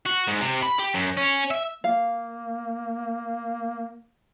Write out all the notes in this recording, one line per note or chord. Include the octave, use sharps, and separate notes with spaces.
F#4
G#2
C3
B5
G4
F#2
C#4
E5
A#3 F5